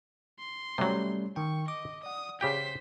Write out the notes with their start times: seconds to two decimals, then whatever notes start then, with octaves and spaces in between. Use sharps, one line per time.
0.39 C6
0.78 C3 F#3 G3 A3 C#4
1.36 D#3 G5 C#6
1.68 D#5 D6
2.03 D5 F#5 D#6
2.41 C#3 G4 C5 G5 B6